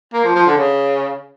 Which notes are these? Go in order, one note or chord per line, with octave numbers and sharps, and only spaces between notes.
A#3
F3
F3
D3
C#3